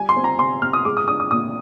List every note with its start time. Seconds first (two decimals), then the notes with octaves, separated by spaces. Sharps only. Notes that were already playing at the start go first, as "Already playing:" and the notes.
Already playing: G3 G#5
0.09 C6
0.16 C4
0.24 A#5
0.39 C3 C6
0.62 C3 F6
0.73 D#6
0.85 G#3 D6
0.97 D#6
1.08 D4 D#6
1.20 D#6
1.31 A#2 D#6